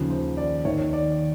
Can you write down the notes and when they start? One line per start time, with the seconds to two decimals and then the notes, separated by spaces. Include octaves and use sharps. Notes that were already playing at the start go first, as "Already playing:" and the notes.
Already playing: D#2 C#3 F3
0.10 C5
0.37 D5
0.65 D#2 D#3 C#5
0.93 D5